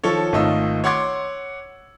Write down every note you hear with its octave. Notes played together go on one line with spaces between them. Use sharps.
D#3 F3 A4 C#5
G#1 D#3 A3 D#4 F4 E6
C#5 F#5 C6 D6 G#6